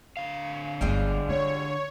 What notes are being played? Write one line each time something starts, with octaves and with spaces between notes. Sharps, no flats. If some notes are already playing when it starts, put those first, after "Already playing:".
D3 F5
G1 G2 G3 G#3 F4
E4 C#5